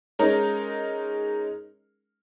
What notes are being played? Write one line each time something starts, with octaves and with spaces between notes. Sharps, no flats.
G#3 C#4 D#4 A#4